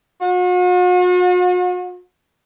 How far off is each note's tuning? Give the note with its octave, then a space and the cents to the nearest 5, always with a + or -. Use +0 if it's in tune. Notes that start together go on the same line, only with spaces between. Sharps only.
F#4 -45